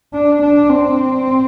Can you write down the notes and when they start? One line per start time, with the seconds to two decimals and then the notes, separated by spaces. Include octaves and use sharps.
0.13 D4
0.42 D4
0.70 C4